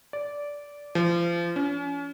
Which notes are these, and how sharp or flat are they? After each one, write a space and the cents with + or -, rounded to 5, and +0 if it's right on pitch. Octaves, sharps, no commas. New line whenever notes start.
D5 -15
F3 -30
C#4 +35